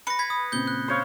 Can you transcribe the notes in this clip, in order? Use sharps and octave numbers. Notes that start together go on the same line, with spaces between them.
B4 A#6 C#7
B5 G#6 B6
D#6
A#2 C#3 C4 G6 G7
F#6
C5 C#5 F5